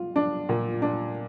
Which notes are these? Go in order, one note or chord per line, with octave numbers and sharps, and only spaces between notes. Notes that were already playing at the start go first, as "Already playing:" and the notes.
Already playing: F4
D4
A#2
D4